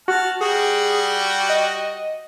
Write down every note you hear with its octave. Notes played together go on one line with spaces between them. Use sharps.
F#4 A5 F6
G3 F#4 G#4 G5
D#5